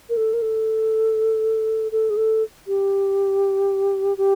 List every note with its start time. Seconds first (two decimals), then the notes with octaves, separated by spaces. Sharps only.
0.10 A#4
0.17 A4
0.33 A#4
0.42 A4
1.92 A4
2.10 G#4
2.17 A4
2.68 G4
4.18 G4